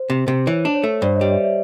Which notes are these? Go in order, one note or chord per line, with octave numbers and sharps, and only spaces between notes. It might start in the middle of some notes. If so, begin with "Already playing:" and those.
Already playing: C5
C3
C3
E3 C#5
D4
C#5
A3
G2 C5 D5
C#5 D#5
G3
D5 E5
D5 E5